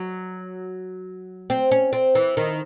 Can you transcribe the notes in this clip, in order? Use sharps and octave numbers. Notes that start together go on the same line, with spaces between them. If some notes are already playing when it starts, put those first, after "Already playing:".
Already playing: F#3
C4
C#4
C4
E3
D#3